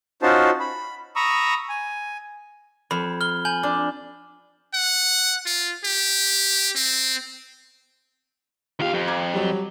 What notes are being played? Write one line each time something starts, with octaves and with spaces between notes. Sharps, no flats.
C#4 D#4 F4 F#4 C5 A5
B5
A#5 B5 C#6 D#6 E6
G#5
F2 B5
F6 G7
G#5 G6 F#7
D4
F#5
F4
G4
C4
D#2 F4 G4 F5
F2
A#5 D6 G#6
F#3 G3